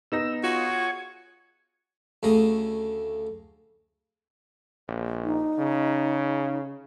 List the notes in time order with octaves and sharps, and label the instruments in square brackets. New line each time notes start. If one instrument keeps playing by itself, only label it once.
[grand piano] B3 D#4 A#6 [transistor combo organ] E6
[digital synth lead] F4 [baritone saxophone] F#4 [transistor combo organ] G#4 C#5
[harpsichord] D2 C#3 A3 A#5 D#6
[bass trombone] A#1
[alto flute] D#4
[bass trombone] C#3